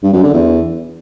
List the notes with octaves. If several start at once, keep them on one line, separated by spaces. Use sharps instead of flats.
G2
F#2
D3
E2